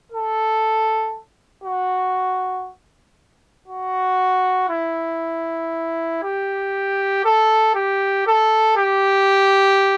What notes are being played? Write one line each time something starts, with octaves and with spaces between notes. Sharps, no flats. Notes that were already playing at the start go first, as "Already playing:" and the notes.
A4
F#4
F#4
E4
G4
A4
G4
A4
G4